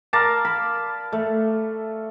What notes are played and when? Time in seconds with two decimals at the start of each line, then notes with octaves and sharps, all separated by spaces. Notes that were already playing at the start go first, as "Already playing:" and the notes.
0.13 A#4 D5 F5 A5
0.45 B5
1.12 A3